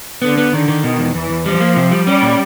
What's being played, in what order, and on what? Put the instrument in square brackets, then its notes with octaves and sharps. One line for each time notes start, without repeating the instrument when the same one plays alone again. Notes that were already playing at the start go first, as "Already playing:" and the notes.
[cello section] D3 [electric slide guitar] B3
[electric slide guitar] B3
[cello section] D3 [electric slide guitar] D#3
[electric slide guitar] D#3
[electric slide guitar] B2 [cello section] D#3
[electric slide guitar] E2
[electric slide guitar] E2 [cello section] E3
[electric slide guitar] E2
[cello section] F3 [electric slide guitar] G3
[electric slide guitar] A#3
C3
G3
[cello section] G3 [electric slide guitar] C#4
[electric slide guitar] A#2